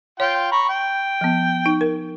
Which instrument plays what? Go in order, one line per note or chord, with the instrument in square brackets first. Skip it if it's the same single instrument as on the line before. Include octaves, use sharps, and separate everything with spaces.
[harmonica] F4 G5 [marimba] C#5
[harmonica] A#5 B5 C#6
G5
[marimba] F3 B3
D#4
A#4